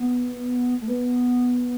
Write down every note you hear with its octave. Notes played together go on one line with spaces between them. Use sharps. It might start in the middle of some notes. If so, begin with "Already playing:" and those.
Already playing: B3
A3
B3